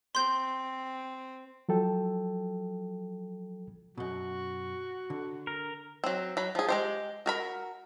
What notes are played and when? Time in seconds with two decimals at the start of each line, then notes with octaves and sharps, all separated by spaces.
0.15 C4 C6 G6
1.69 F3 F#3 A4 G5
3.98 F#2 B2 F#4
5.10 D3
5.47 A#4
6.04 F#3 C4
6.37 F#3 B5
6.55 F3 G#4
6.69 G#3 G4 C5
7.26 F#4 A#4 B5